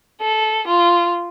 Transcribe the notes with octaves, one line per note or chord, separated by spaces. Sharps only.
A4
F4